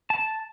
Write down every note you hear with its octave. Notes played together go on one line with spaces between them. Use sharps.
A5